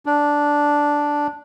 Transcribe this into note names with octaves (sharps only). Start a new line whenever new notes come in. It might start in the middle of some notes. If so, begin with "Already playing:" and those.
D4